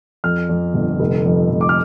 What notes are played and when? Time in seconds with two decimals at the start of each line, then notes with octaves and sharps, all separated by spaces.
0.24 F2 F6
0.49 F2
0.74 G1
1.00 F1
1.25 F2
1.50 F1
1.61 D6
1.69 F6